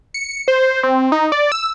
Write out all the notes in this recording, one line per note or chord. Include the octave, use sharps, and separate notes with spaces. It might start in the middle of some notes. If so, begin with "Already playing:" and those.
C#7
C5
C4
D#4
D5
E6